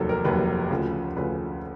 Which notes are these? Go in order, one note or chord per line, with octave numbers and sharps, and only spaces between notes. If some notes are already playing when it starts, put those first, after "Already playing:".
Already playing: F1 D#2 D#3 F#3 G4 A4
A#4
F1 D#2 D#3 F#3 B4
D2 C#3 F3
D2 C#3 F3 B4